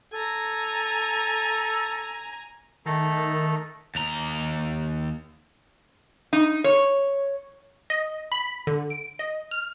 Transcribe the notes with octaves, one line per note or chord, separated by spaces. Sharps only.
A4 G#5 A#5
D#3 A3 A4 A#5
D#2 A#5
D#4
C#5
D#5
B5
D3
D7
D#5
F6